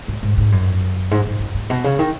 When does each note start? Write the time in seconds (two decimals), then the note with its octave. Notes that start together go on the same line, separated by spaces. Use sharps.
0.08 G#2
0.23 G#2
0.38 G#2
0.52 F#2
1.11 G#2
1.25 G#2
1.40 F#2
1.54 G#2
1.70 B2
1.84 C#3
1.99 D#3